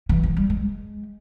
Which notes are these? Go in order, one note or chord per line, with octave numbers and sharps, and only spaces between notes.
E3
F3
G3
G#3